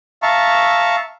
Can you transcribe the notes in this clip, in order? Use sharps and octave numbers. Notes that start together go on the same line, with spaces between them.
E5 F5 A5 A#5 C#6